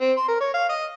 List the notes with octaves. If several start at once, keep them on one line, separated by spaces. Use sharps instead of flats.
C4
C6
A#4
C#5
F5
D#5